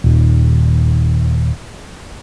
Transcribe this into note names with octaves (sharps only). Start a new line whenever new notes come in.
D#1 D#2